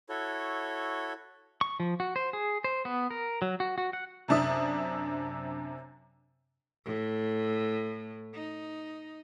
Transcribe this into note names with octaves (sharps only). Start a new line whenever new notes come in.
E4 F#4 A4 C#5
C#6
F3
F#4
C5
G#4
C5
B3
A#4
F#3
F#4
F#4
F#5
F#2 C3 D4 E5 D#6
A2
D#4